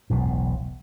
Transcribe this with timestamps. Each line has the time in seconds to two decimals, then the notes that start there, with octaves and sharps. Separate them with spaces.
0.10 E1 B1 A2